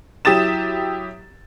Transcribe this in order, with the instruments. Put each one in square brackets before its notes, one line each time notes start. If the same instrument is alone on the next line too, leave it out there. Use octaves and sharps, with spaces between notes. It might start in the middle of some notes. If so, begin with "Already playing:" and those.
[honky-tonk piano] F#3 E4 G4 D#6 A6 E7